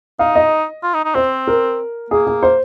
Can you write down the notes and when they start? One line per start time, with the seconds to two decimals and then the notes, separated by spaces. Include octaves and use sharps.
0.19 D#4 F5
0.36 D#5
0.83 F4
0.94 D#4
1.05 D#4
1.15 C4 C5
1.47 A#4
2.11 A#3 G#4
2.27 G#4
2.43 C5